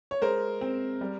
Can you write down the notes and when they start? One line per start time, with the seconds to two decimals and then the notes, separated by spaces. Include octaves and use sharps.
0.11 C#5
0.22 G#3 A#4 C5
0.61 C4
1.01 G3